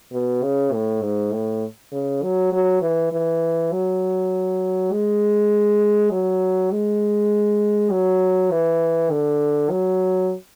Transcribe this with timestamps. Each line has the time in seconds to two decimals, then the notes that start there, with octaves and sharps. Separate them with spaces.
0.12 B2
0.43 C#3
0.73 A2
1.02 G#2
1.33 A2
1.92 C#3
2.23 F#3
2.52 F#3
2.82 E3
3.12 E3
3.72 F#3
4.92 G#3
6.12 F#3
6.71 G#3
7.91 F#3
8.51 E3
9.10 D3
9.70 F#3